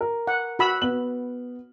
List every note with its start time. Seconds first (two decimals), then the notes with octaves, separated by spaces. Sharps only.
0.01 A#4
0.27 F#5
0.59 F#4 B5 E6
0.82 B3 F#7